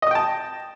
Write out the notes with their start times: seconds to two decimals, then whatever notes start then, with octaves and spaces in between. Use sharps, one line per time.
0.02 D#5
0.07 D#6
0.11 G5
0.15 A5